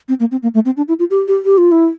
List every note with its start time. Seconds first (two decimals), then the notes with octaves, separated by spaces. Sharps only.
0.09 C4
0.20 A#3
0.32 C4
0.43 A#3
0.54 A3
0.65 C4
0.77 D4
0.88 E4
0.99 F4
1.10 G4
1.28 G4
1.45 G4
1.58 F4
1.72 E4